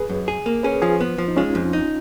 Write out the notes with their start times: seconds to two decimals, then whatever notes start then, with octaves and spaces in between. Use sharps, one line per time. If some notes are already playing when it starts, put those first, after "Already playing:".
Already playing: G#4 B4
0.10 F#2
0.28 G#4
0.46 A#3
0.63 C#4 G#4 B4
0.82 F3 F4 G#4
1.00 B3
1.18 F3
1.28 D#4
1.37 G#3 C#4 F4
1.55 F2
1.73 D#4